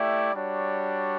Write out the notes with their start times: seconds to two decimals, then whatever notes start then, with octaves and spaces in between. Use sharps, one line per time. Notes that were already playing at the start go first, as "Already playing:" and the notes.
Already playing: A3 E4 G4 D5
0.33 G3 D4 F#4 C#5